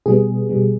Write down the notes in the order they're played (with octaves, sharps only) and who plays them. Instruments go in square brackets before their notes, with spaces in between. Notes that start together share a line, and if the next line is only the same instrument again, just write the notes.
[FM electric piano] B2 G3 B3 G#4
B2 G3 B3